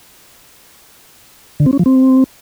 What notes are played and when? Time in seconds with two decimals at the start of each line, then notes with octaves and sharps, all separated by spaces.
1.60 D3
1.66 C4
1.73 C#4
1.79 F3
1.86 C4